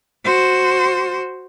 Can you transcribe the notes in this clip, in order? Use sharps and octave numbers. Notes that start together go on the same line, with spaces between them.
F#4 C5